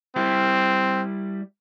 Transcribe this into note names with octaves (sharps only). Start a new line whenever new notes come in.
G3 C4 E4 G4